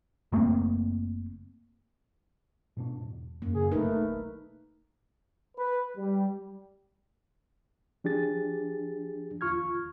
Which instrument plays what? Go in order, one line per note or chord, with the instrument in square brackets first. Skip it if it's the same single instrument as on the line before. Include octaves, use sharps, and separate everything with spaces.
[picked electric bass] F#1 A3 A#3 C4
G#2 B2 D4
E1
[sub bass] F#2 [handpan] A#3
[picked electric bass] C#3 [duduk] G#4
[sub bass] F1 [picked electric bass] B1 [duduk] A3 [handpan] D#4 A#4 B4
[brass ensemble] B4
G3
[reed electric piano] F3 D4 G4 G#4 A6
D#2 F4 C#6 F6 G#6